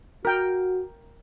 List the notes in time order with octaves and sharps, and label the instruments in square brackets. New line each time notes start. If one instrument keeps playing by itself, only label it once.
[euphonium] F#4 [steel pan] A#4 G5